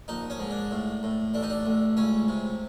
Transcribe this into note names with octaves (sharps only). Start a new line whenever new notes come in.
A#1 D#4
C#4
G#2
D4
A2
A2
A1 D4
D#4
D4
A1
C#2 C#4
C3